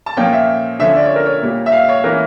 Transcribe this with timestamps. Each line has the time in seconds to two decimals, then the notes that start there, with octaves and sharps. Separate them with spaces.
0.06 A5
0.17 A#2 F3 A#3 C#4 G5
0.33 E5
0.79 D3 F3 C#4 E5
0.95 D5
1.06 C#5
1.16 A#4
1.26 C#5
1.42 A#2 G3 A#3
1.66 E5
1.72 F5
1.89 C#5
2.04 E3 A#3 C#4 A#4